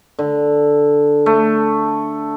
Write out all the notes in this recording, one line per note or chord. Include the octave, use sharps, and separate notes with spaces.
D3
A3